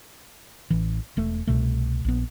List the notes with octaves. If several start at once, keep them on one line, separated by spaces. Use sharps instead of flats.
A1 E3
E1 A3
C2 B2 A3
A#1 B3